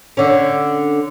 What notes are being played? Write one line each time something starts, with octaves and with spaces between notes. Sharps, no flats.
D3 C#4